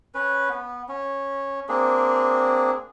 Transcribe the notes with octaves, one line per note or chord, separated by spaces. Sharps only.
C#4 B4
B3
C#4
A#3 C4 D4 G#4